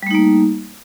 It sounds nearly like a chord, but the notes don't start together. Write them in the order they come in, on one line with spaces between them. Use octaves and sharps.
G3 A3 D#4 A#3